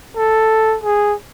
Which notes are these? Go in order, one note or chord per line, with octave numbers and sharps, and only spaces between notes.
A4
G#4